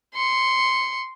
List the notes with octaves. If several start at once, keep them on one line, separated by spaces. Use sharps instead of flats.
C6 C#7